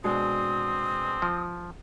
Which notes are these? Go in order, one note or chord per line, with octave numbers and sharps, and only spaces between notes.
B2 G#3 C4 D4 D#6
F3